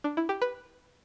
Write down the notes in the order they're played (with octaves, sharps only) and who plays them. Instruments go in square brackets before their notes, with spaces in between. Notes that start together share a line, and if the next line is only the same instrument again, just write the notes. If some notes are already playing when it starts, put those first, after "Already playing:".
[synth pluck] D4
E4
G4
B4